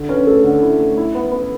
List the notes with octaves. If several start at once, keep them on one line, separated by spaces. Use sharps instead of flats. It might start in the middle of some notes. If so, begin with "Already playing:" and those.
Already playing: D3
C#4 B4
A3 A4
D3
E4
A3
E4
B3
B3